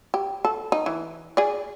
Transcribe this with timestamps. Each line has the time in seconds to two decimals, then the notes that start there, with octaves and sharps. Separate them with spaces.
0.14 G4
0.45 A4
0.72 D#4
0.86 E3
1.37 G#4 D5